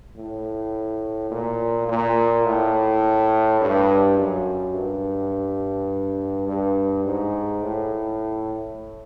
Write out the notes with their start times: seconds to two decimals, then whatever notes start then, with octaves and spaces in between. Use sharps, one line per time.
0.16 A2
1.31 A#2
1.88 A#2
2.46 A2
3.61 G2
4.18 F#2
4.75 G2
6.48 G2
7.05 G#2
7.62 A2